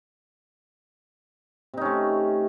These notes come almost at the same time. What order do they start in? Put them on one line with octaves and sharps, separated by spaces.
C3 D#4 C#4 A3